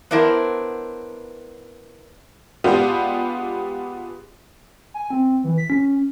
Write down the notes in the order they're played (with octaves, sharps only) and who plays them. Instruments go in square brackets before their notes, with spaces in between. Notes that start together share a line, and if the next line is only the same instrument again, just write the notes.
[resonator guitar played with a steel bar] B3 D4 E4 A#4 C5
[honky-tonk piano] G#3 B3 D4 F4 G4
[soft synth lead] G#5
C4
E3
B6
C#4